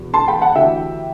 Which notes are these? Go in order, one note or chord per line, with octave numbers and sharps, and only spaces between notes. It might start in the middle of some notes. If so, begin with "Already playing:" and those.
Already playing: E2 B2
A5 C6
G5 B5
F#5 A5
D2 C3 E3 E5 G5